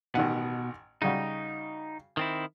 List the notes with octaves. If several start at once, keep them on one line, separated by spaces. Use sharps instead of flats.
A1 B2 D#3 F#5
C#3 G3 D#4 F#4
D#3 C4 E4